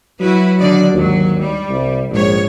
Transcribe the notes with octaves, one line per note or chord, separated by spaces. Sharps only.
F#3 E4 F#4 B4
D3 D#3 D5
D#2 G#2 F#3
G3
C2
A#1 G#2 C#5